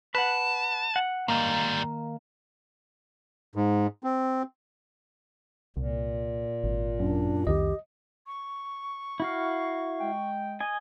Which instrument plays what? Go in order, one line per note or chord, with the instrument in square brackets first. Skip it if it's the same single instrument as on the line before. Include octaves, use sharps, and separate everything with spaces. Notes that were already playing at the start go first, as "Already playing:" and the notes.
[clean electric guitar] B4 F#5 [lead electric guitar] A5
[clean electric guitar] F#5
[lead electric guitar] G#2 G3 [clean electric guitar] D#3 A#3
[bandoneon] G#2
C4
[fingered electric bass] C2 [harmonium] A#2
[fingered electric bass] G#1
[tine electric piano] F#2 [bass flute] D4
[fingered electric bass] C2 F2 D#3 [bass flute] G4 [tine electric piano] D#5
[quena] C#6
[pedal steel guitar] E4 F#4 F5
[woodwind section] G#3 G5
[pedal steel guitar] D#5 G#5